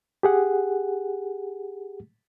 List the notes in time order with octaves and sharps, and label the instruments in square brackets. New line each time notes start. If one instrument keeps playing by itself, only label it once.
[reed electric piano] G4 G#4 F#5